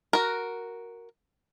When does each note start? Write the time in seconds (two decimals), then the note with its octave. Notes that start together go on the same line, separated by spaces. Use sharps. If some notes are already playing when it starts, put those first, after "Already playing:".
0.13 F#4 A#4